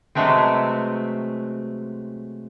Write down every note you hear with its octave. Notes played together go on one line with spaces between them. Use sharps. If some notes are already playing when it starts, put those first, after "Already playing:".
C3 F#3 G#3 A3 B3 C4